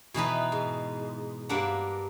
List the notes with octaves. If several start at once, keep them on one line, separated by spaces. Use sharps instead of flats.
B2 E3 D#4 B4
G#2
G2 A#3 D4 F#5